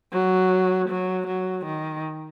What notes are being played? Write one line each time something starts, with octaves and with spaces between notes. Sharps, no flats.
F#3
F#3
F#3
D#3